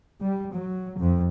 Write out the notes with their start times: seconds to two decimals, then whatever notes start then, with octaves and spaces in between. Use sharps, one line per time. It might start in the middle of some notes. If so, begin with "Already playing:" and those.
0.18 G3
0.52 F#3
0.98 F2